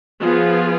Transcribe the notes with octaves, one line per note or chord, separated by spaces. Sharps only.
F3 B3 F4 G#4